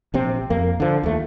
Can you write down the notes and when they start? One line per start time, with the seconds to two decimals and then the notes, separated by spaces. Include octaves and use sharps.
0.14 A#1 C3 C4
0.50 F2 A#3
0.80 D3 F3
1.03 D#2 A3